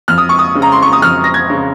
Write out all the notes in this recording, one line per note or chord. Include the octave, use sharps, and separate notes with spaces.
F2 F6
D#6
C#6
D#6
C#3
A#5
C6
C#6
D#6
F2 F6
A#6
G#6
C#3